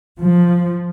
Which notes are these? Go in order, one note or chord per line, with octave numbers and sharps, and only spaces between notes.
F3